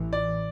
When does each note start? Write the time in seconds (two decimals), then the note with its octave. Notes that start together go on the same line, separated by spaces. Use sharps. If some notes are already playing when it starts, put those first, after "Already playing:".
Already playing: A1 A2 E3
0.13 D5